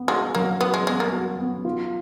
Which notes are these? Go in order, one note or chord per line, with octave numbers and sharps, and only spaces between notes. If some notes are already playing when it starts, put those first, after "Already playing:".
Already playing: B3
G#3 F#4
F#3 A#3
B3 F#4
G#3
G#3 B3
A#3
F#4
B3
F4